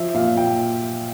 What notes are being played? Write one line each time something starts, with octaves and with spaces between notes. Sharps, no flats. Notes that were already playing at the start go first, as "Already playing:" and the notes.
Already playing: F3 E5
A#2 F5
A#2 G5